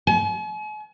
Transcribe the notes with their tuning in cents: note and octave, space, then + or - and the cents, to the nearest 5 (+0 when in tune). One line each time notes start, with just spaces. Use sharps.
G#5 +45